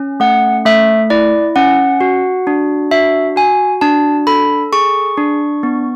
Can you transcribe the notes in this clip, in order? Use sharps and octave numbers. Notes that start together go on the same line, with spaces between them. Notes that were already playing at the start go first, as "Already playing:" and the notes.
Already playing: C#4
A3 F#5
A3 E5
E4 D5
C#4 F#5
F#4
D4
F#4 E5
F#4 G#5
D4 A5
A4 B5
G#4 C#6
D4
B3